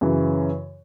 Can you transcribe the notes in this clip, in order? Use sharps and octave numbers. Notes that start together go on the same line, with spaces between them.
F#2 C#3 E3